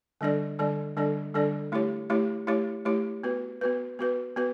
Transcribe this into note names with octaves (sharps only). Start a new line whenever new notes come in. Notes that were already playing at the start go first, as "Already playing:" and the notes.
D3 G3 D4 A4 D5
D3 G3 D4 A4 D5
D3 G3 D4 A4 D5
D3 G3 D4 A4 D5
A3 E4 G4 C#5
A3 E4 G4 C#5
A3 E4 G4 C#5
A3 E4 G4 C#5
B3 F#4 B4
B3 F#4 B4
B3 F#4 B4
B3 F#4 B4